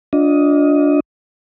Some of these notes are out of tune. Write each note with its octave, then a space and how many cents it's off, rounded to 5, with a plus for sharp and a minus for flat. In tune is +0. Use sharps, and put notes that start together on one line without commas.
D4 -15 F4 +30 D#5 +10